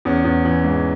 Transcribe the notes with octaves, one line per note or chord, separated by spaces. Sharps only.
E2 C#4
E2
E3
G#2